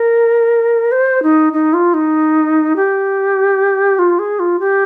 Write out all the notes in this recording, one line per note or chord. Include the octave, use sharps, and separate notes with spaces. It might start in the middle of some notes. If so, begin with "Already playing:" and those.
Already playing: A#4
C5
D#4
D#4
F4
D#4
G4
F4
G#4
F4
G4